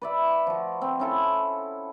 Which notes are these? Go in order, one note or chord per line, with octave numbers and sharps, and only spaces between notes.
B4 D5 E5
F3 F#4
C4
C#4 E4 A4